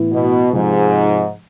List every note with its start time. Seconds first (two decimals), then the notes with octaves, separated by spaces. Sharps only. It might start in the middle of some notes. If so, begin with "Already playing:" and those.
Already playing: A2 E3 B3 E4
0.13 B2
0.53 G#2 C3 F3 G#3